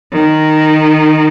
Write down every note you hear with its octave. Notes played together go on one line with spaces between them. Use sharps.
D#3